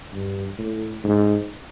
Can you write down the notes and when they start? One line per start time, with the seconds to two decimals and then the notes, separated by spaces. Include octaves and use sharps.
0.13 G2
0.58 A2
1.04 G#2